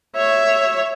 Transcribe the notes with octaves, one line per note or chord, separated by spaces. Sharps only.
C#5 E5